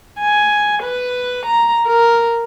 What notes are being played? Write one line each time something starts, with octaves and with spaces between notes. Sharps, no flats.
G#5
B4
A#5
A#4